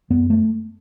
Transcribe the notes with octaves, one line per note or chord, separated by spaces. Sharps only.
F#2 B3
A3